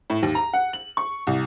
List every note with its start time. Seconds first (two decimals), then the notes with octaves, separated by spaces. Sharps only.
0.10 A2
0.23 D#2
0.35 A#5
0.53 F#5
0.73 F#7
0.97 C#6
1.27 C2